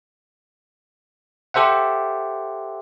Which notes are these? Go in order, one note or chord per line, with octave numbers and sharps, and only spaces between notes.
G4 A4 C5 E5 F#5